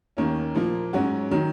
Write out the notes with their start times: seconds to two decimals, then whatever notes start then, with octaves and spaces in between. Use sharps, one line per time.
0.17 D#2 D#3 A#3 C#4
0.55 A#2 F3 A#3
0.93 G#2 F#3 C#4 F#4
1.31 D#3 F#3